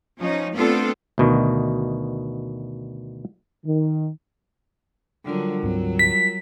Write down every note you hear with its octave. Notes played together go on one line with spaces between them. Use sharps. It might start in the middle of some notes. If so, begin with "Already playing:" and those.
F3 C#4 D#4
A3 B3 C4 D4 F4 A4
D2 B2 D#3
D#3
D3 F#3 G3 F4 A#4
D2 G#2 F#3 C4
B6